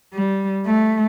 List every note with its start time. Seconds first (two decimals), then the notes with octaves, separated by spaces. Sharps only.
0.13 G3
0.66 A3